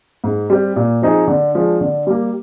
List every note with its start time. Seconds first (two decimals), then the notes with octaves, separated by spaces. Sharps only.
0.24 G#2
0.50 G3 C4 G4
0.76 A#2
1.02 F3 C4 D#4 G#4
1.28 D3
1.55 F3 G#3 D4
1.81 D3
2.07 G3 A#3